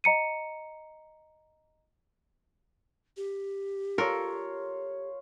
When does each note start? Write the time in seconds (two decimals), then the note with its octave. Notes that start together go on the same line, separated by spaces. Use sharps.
0.04 D#5 A#5 C#7 D#7
3.17 G4
3.98 F4 A4 A#4 C#5